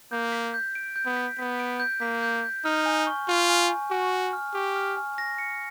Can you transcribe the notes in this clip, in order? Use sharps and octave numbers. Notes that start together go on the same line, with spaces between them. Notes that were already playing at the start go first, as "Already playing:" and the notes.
A#3 G6
B6
G6
D7
G6
B3
B6
B3 B6
D7
G6
A#3 B6
G6
G6
D#4 F6
G#5
C#6
F4 C#6
G#5
G#5
F#4 G#5
G#5
F6
G4 C#6
F6
G#5
A#6
C#7